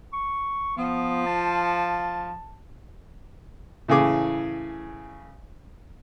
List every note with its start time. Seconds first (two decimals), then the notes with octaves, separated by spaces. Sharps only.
0.13 C#6
0.77 F3 B3
1.26 A5
3.88 A2 C#3 E3 G#4 D6